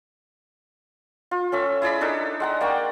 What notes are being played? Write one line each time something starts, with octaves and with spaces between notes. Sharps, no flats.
F4
C#4 A4 E5
E4 G#4 D5 B5
D4 D#4 A4
G#3 F#5 A#5
A#3 D5 G5 C#6